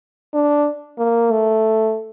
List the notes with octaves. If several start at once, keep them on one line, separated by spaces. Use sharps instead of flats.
D4
A#3
A3